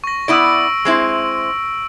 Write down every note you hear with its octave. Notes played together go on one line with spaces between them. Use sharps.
C#6 A#6
B3 E4 D5 E6 D7
G#3 C4 E4